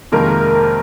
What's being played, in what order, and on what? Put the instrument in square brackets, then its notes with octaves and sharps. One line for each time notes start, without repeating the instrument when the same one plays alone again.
[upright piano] F2 C3 D#3 G#3 A#3 A#4